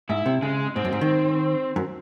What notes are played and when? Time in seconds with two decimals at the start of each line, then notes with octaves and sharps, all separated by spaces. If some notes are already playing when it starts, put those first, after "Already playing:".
0.09 G#2 E4
0.26 C3
0.42 C#3 G#3
0.76 G#2 C4
0.85 F#2
0.92 G#2
1.01 D#3
1.76 F#2